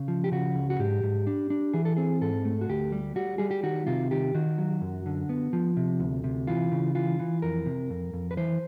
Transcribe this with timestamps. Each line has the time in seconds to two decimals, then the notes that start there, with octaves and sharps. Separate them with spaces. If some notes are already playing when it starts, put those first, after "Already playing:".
Already playing: C#3
0.08 F3
0.24 G4
0.32 C#3 F#4
0.55 C#2
0.70 F#4
0.79 G#2 G4
1.03 G#2
1.27 D4
1.50 D4
1.73 E3 G#4
1.85 A4
1.97 C4 G#4
2.21 G#2 A4
2.45 A3
2.61 F#4
2.69 D2 G4
2.92 G3
3.16 G3 F#4
3.38 G3 G#4
3.51 G4
3.63 D#3 F#4
3.87 C3 F4
4.11 D#3 G4
4.35 D#3 F#4
4.58 F#3
4.82 F#2
5.06 D3
5.29 B3
5.53 F3
5.77 C3
6.00 D2
6.24 C3
6.47 E3 F4
6.72 C#3
6.95 E3 F4
7.19 E3
7.42 F2 A#4
7.66 C3
7.90 F2
8.13 F2
8.31 B4
8.37 E3 C5